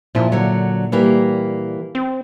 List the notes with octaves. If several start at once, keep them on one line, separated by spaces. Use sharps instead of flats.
A#2 F3 E4
D3 F#3
E3 G3 A#3
C4